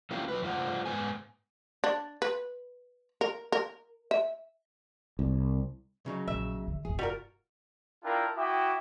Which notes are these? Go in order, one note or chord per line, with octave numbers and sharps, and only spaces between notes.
A#3 C#4 E4 F4 G4
F#3 B4
G2 G3 A3 F4 C5 F#5
G#2 B3 G#5
D4
B4
A#4
A#4
E5
C2
C#3 F#3 D#4
A#1 E5
D3
F1 G2 G#4
G3 F4 F#4 A#4
D4 E4 F4 A#4 G5 A5
E4 F#4 E5 G5 D6 D#6